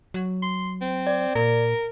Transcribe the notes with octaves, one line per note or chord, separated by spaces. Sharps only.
F#3
C6
C4
D5
A#2 A#4